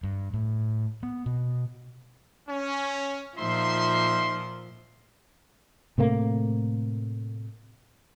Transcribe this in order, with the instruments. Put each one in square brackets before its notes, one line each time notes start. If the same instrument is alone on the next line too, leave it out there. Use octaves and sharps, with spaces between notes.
[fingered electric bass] G2
A2
B3
B2
[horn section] C#4
[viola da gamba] A#2 F3 [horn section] D#4 E5 C6
[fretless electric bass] A2 C3 A3 A#3